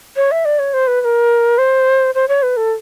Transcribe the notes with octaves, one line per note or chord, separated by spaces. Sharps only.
C#5
E5
D5
C#5
C5
B4
B4
A#4
C5
C5
C#5
B4
A4